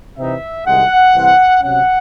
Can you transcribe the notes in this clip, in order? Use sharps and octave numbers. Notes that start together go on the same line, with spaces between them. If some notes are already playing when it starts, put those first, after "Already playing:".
C3 E3 C4 D#4 E5
C2 C3 D#3 G#3 F#5
C2 C3 E3 C4
C3 F#3 C#4 F#5